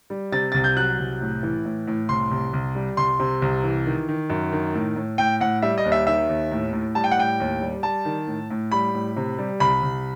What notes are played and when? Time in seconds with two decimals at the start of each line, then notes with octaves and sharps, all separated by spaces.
0.10 G3
0.32 C3 A6
0.52 C2 A6
0.64 G6
0.77 F#3 F#6
0.99 C2
1.21 A2
1.43 E3
1.65 A2
1.87 A2
2.09 C2 C6
2.31 C2
2.53 C2
2.75 G3
2.97 C2 C6
3.19 C3
3.42 C2
3.63 E3
3.86 D#3
4.08 D#3
4.30 F#2
4.52 D#3
4.75 A2
4.96 A2
5.18 A2 G5
5.40 A2 F#5
5.62 G3 E5
5.78 D#5
5.85 D#2
5.92 E5
6.07 D#3 E5
6.29 D#2
6.51 A2
6.73 A2
6.95 G3 A5
7.04 G5
7.11 F#5
7.17 A2 G5
7.40 D#2
7.61 G3
7.83 G3 A5
8.05 D#3
8.27 A2
8.50 A2
8.72 G3 B5
8.94 A2
9.16 C3
9.38 G3
9.60 C2 B5
9.83 C2